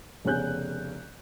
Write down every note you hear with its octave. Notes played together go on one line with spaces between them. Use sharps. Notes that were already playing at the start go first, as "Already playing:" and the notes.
F1 C#3 B3 C#4 F#6 G6